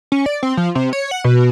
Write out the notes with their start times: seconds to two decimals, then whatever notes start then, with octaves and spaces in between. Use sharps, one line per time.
0.12 C#4
0.26 D5
0.43 C4
0.57 F3
0.75 C3
0.93 C#5
1.11 F#5
1.24 B2